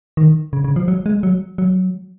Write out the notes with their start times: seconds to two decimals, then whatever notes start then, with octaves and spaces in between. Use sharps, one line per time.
0.17 D#3
0.53 C#3
0.64 C#3
0.76 F3
0.88 F#3
1.06 G#3
1.23 F#3
1.58 F#3